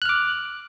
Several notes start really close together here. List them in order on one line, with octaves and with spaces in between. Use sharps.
F#6 F6 D6